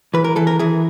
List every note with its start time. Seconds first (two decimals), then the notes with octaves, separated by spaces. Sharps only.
0.14 E3 B4
0.24 A#4
0.36 E3 A4
0.47 A#4
0.59 E3 G#4